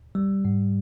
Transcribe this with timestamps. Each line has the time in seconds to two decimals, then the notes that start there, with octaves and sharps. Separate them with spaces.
0.15 G3
0.45 G#2